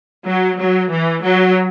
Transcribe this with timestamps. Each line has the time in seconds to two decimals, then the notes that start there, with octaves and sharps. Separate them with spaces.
0.25 F#3
0.58 F#3
0.91 E3
1.23 F#3